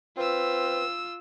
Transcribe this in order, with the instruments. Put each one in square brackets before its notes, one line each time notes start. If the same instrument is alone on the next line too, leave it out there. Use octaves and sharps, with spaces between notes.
[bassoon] C4 [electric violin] F4 E6 [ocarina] B4